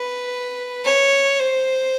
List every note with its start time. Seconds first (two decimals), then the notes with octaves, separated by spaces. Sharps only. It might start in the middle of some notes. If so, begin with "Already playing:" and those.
Already playing: B4
0.84 C#5
1.39 C5